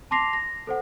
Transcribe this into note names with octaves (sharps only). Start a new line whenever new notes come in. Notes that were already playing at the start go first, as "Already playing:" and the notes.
A5 C6 D6 A#6 C7 F7
A#6
A4 C5 F#5